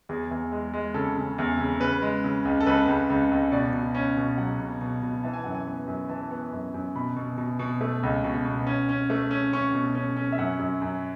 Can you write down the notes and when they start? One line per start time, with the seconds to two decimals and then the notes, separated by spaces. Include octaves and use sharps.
0.09 E2 G#4
0.31 E2
0.52 G#3
0.73 G#3
0.94 C#3 A4
1.17 C#3
1.38 E2
1.59 C#3
1.80 C#3 B4
2.02 G#3
2.24 C#3
2.45 C#2
2.60 A4
2.66 C#2 B4
2.88 C#2
3.10 C#2
3.31 C#2
3.52 B2 D5
3.73 B2
3.95 C#4
4.17 B2
4.38 F#3 F#5
4.60 B2
4.81 B2
5.02 B2
5.23 E3 A5
5.33 G#5
5.44 F#2 F#5
5.55 G#5
5.67 B3
5.88 F#2
6.09 E3 A5
6.31 B3
6.53 F#2
6.74 F#2
6.95 B2 B5
7.16 B2
7.38 B2
7.59 B2
7.81 A3
8.03 C#2
8.24 B2
8.45 B2
8.67 C#4
8.89 C#4
9.10 A3
9.31 C#4
9.53 C#4 C#6
9.74 B2
9.95 C#4
10.17 C#4
10.32 E5
10.38 F#2 F#5
10.59 F#2
10.82 F#2